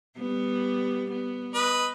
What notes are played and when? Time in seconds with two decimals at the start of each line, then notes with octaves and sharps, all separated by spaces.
0.18 G3 B3
1.10 B3
1.54 B4 D#5